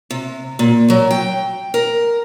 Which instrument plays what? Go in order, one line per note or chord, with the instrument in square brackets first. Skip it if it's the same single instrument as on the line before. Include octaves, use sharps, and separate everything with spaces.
[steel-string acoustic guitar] C3
A#2
F#3
G5
A#4